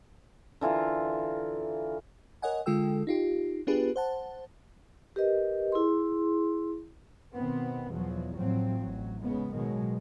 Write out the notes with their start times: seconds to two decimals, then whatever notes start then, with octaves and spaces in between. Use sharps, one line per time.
0.61 D3 E3 F4 A#4
2.42 A#4 C#5 D#5 F#5 G#5
2.66 D3 G#3 F4 A4 G5 E6
3.07 D#4 F4 G4
3.67 B3 D4 F4 G4 G#4 B4
3.96 C5 F#5 A5
5.16 G4 A#4 B4 D#5
5.72 E4 G#4 C6
7.34 B2 D#3 B3 C4
7.89 E2 B2 F3 F#3
8.37 A1 A2 F3 F#3 C4
8.79 A1 F#3
9.21 C#3 G#3 B3
9.53 B2 D#3 F#3 G#3